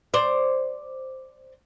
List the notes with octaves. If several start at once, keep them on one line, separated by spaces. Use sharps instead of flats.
C5 D5